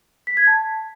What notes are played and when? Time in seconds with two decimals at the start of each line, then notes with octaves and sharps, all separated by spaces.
0.27 B6
0.37 G#6
0.47 A5